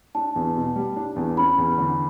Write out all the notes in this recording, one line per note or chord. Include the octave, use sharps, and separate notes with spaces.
D4 A5
E2
B2
G3
D4
E2
C#4 B5
E2
D3